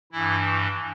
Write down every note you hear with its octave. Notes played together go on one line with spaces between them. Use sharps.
G2 E3 E4